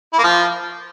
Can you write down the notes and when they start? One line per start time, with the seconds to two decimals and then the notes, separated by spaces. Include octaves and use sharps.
0.13 E4
0.18 A#3
0.24 F3